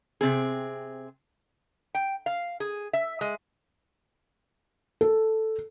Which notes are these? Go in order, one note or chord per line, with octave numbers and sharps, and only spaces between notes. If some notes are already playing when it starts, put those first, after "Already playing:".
C3 C4 G#4
G5
F5
G#4
E5
G#3
A4